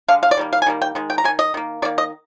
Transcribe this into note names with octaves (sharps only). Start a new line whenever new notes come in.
D3 G#3 F5
F5
D5
D#3 G3 A#3
F5
G#5
D#3 G3 A#3
G5
D#3 G#3
G5
A#5
G#3 G#5
D#3
D#5
D#3 A#3
D#3 A#3 D5
D#5